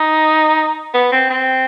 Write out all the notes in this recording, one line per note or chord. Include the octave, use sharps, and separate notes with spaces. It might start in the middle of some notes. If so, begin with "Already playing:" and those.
Already playing: D#4
B3
C4
C4